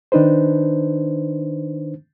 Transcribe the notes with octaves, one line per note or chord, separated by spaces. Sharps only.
D#3 D4 D#4 B4 C5